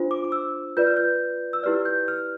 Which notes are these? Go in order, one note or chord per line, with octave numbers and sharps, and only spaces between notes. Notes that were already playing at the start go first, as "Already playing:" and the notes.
Already playing: D4 F4 C5
D6
D6
E6
F4 B4 D5 G6
F6
G6
E6
E4 G4 B4 D5 F6
G6
F6